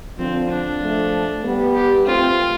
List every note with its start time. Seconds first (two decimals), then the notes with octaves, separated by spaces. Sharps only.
0.18 D3 F3 C4
0.49 D4
0.81 F3 A3
1.44 G3 B3
1.75 G4
2.06 A3 C4 F4